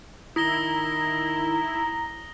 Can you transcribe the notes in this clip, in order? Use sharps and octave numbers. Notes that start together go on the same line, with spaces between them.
D#3 E4 A#5 D#6 A#6 G7